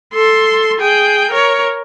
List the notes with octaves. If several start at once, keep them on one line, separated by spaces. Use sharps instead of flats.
A4 C6
G#4 G5
A#4 C#5